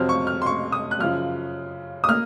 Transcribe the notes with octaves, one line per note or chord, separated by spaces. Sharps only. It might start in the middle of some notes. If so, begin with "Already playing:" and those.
Already playing: F2 C3 F#3 C4 F6
C#6
F6
C6
C#6
D#6
F#6
F#2 C#3 F3 F6
D#6
A#3 F6